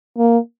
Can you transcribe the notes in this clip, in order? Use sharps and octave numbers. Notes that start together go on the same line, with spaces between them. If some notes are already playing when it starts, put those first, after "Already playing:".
A#3